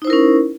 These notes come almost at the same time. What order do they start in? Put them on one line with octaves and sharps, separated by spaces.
D#4 C5 E4 A#4 C#4